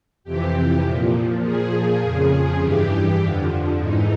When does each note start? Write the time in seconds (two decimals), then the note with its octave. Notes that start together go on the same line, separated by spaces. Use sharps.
0.24 F2 C3 E3 G4
0.84 A#2 F3
1.43 A#2 F3 G#4
2.02 F2 C#3 F3 G#4
2.61 G2 E3 G4
3.20 F2 D3 F3
3.79 G#2 E3 D#4